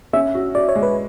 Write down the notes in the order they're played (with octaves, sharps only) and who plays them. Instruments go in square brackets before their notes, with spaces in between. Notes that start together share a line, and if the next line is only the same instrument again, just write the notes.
[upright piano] C#4 [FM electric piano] E5
[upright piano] F#4
[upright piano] F#4 [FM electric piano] D5
[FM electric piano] C#5
[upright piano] G#3
[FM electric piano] B4